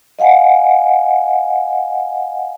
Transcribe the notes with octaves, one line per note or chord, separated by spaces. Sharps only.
D#5 F5 F#5 G#5